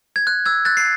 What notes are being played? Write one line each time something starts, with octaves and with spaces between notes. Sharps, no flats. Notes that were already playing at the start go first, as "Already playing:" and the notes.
G#6
F#6
E6 G#6
F#6 A6
C7